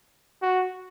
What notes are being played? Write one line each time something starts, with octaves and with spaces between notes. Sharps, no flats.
F#4